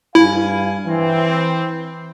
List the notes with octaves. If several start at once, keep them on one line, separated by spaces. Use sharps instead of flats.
G2 E4 F5 G#5
E3 C4